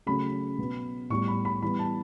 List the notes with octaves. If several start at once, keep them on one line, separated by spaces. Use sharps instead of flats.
C#3 F#3 A3 C#4 B5
B2 F#3 B3
A2 G3 B3 C#6
B5
B5
E3 G3 B3 B5
A5